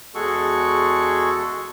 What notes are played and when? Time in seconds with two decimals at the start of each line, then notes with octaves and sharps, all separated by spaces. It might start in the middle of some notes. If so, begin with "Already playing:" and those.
0.15 E2 G#3 F#4 G#4 A4 C#6